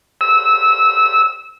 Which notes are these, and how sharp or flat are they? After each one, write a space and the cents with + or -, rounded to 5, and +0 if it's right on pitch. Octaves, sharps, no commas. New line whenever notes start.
E6 -25